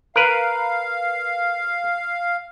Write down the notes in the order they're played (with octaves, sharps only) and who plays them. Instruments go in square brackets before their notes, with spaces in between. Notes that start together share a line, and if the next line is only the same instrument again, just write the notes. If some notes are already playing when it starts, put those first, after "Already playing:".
[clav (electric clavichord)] A#4 B4 [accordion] F5